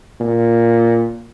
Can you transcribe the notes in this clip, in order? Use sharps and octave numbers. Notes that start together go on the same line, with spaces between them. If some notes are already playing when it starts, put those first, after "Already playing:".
A#2